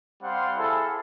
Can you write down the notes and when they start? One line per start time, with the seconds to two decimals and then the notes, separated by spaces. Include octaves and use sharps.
0.23 G3 C4 F5 F#5 C6
0.57 E4 G#4 A4